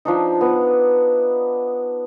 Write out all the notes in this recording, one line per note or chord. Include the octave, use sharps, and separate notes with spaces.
F3 D4 D#4
B3